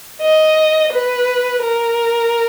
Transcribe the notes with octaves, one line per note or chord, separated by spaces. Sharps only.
D#5
B4
A#4